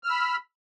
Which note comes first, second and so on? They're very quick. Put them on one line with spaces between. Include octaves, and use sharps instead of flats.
F6 E6 B5